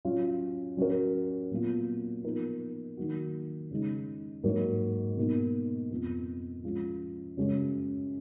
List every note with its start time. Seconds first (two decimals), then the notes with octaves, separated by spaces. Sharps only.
0.05 F#3 C#4 F4
0.77 F#3 C#4 F#4 A#4
1.51 A#2 F#3 B3 F4
2.24 F3 B3 D#4 A#4
2.97 D#3 F#3 A#3 D#4 F#4
3.71 C#3 G#3 D#4
4.44 G#2 F#3 A#3
5.17 B2 A#3 D#4
5.91 F2 F3 B3
6.63 F3 G#3 C#4 F4
7.37 F#2 C#3 G#3 C#4